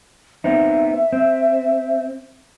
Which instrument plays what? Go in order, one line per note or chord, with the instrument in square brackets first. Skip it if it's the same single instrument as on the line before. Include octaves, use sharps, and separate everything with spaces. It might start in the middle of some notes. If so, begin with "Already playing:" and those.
[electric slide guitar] B3 C4 D#4 [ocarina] E5
[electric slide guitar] C4